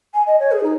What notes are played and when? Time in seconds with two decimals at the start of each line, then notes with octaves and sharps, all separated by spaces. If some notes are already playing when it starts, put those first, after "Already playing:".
0.14 G#5
0.27 D#5
0.40 C#5
0.52 G#4
0.63 D#4